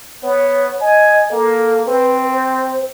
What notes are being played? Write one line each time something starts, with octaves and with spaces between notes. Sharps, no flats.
B3 C#5
D#5 G#5
A#3 A4
C4 B4
C5